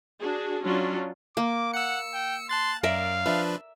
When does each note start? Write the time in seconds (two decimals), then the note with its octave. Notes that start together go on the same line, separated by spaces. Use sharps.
0.20 D4 F#4 G#4
0.64 F#3 C#4 D4 F4
1.37 A#3 D6
1.74 F#5 E6 C#7
2.14 G5
2.49 A5 C6 F#6 A6
2.83 F#2 A#4 D5 E5 F5
3.26 F3 D4 B4 E5